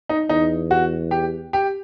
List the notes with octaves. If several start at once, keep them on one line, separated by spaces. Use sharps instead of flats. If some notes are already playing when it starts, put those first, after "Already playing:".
D#4
E2 D#4
F#4
G4
G4